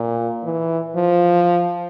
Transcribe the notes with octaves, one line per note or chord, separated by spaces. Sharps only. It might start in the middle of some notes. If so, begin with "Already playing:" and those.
Already playing: A#2
E3
F3